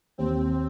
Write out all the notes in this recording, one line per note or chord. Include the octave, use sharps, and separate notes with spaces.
D#2 C4